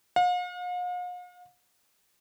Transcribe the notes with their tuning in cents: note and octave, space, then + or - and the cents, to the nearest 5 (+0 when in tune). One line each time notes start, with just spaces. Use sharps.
F5 +45